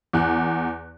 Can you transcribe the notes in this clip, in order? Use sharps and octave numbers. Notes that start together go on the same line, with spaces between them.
E2 F#6